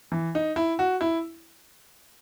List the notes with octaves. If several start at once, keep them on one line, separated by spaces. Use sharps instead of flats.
E3
D#4
E4
F#4
E4